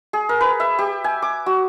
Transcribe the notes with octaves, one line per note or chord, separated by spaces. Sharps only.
G#4
A#4
B4
E5
G4
G#5
D6
F#4